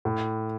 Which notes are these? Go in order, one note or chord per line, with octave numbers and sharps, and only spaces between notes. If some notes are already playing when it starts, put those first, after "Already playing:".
A2